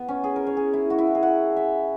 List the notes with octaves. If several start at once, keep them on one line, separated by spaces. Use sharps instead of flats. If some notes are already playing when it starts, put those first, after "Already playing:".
Already playing: B3
C#4
G#4
A#4
C#5
G#4
E4
F#4
E4
F#4
G#4
F#5
E5